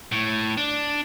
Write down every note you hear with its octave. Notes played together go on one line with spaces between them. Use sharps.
A2
D4